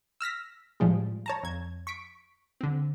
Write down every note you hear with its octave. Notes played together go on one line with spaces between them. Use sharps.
E6 F6 A#6 B6
A2 F3 G3 G#3
C#5 A5 A#5
F2 G#6
C#6 B6 D7
D3 C4